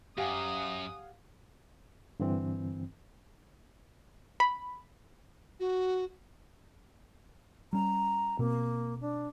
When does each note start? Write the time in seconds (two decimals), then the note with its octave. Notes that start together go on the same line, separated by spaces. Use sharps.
0.18 F#2 G4 F5 F#5 G#5 D#6
2.20 G2 D3 E3 C4
4.40 B5
5.60 F#4
7.73 G3 C#4 A#5
8.39 B2 A#3 C4
9.01 D4